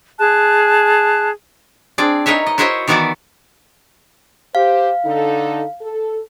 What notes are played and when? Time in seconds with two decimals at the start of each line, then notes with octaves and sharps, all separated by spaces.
0.19 G#4 A5 F#6
1.98 C4 D4 G#4 D5
2.26 D#4 A#4 B4 C#5 E5
2.47 D#5
2.58 E4 F#4 C5 C#5 D#5 E5
2.88 D#3 E3 B3 E4 F#4 D5
4.55 G4 C5 F5
5.05 D3 D#4 A4
5.81 A4